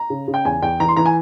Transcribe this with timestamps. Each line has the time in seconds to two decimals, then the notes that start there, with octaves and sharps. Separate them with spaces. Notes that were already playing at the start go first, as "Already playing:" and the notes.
Already playing: A#5
0.10 C#3
0.28 C#3
0.34 G5
0.45 E2 G#5
0.62 E2 G5
0.80 E3 A#5
0.88 C6
0.96 E3 A#5
1.05 G#5